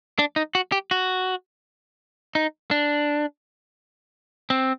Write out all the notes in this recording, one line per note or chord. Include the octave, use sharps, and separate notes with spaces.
D4
D#4
F#4
G4
F#4
D#4
D4
C4